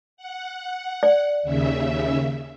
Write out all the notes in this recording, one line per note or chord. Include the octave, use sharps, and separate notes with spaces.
F#5
D5
D#2 C#3 E5